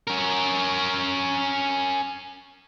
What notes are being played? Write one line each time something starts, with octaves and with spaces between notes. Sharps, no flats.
C#4 A#4